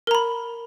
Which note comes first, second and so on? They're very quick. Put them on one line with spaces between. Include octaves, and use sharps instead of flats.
A#4 A#5 B5